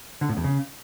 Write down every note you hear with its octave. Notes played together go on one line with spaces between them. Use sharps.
D3
A2
E2
C#3